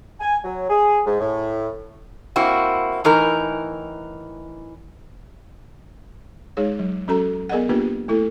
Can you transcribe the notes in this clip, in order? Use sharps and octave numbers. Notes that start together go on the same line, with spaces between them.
G#5
F#3
G#4
G#2
A2
A#3 C4 E4 F#4
A2 E3 D#4 A#4
G#3 D#4 G#4 C#5
F#3
F#3 C#4 F#4 A4 A#5
B3 G#4 A#4 D5 D#5 F#5
A#3 B3 D4 F4 G4 B4
A3 E4 A4